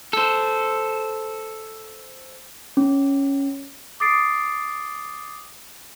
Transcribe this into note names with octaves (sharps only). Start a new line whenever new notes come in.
A4 C5
C#4
D6 D#6 A6 C7 D7